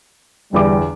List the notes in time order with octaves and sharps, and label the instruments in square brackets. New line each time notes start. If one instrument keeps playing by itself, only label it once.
[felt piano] G1 E2 D6 [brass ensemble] G3